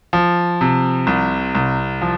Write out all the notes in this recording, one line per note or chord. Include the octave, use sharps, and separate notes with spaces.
F3
C3
C2
C2
F3